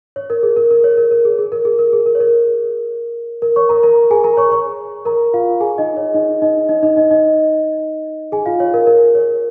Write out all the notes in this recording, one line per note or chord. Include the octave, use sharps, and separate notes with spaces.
C#5
A#4
G#4
A#4
A#4
C#5
A#4
A#4
G#4
G#4
A#4
G#4
A#4
G#4
A#4
C#5
A#4
A#4
C#5 C#6
A#4 A#5
A#4 A#5
G#4 G#5
A#4 A#5
C#5 C#6
C#5 C#6
A#4 A#5
F4 F5
G#4 G#5
D#4 D#5
C#5
D#4 D#5
D#4 D#5
D#4 D#5
D#4 D#5
D#4 D#5
D#4 D#5
G#4 G#5
F4 F5
C#5
A#4
A#4
C#5